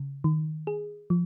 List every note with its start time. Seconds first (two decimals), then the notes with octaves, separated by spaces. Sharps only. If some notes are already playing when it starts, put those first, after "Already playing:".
Already playing: C#3
0.24 D#3
0.67 G#4
1.10 F3